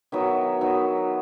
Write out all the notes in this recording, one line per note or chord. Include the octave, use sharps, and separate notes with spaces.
D#3 F#3 B3 E5
D#3 F#3 B3